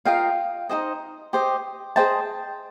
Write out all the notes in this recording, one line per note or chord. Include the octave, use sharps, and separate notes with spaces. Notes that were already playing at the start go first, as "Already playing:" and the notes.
F4 A#4 D#5 F5 G5
D#4 G#4 C5 D#5
G4 C5 D#5
G#4 C5 D#5 G5 A5